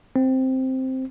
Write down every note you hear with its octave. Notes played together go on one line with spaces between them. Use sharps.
C4